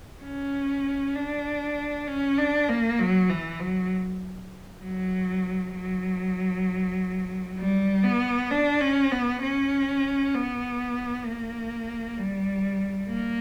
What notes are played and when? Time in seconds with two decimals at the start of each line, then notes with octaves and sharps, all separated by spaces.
0.23 C#4
1.15 D4
2.07 C#4
2.38 D4
2.69 A#3
2.99 F#3
3.30 E3
3.60 F#3
4.82 F#3
5.75 F#3
7.58 G3
8.03 B3
8.51 D4
8.81 C#4
9.12 B3
9.42 C#4
10.34 B3
11.25 A#3
12.18 G3
13.09 A#3